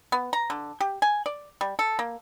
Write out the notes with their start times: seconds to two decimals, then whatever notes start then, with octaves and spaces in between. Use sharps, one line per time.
0.12 B3
0.33 A#5
0.50 D3
0.80 G4
1.02 G#5
1.26 D5
1.61 G3
1.79 A4
1.99 A#3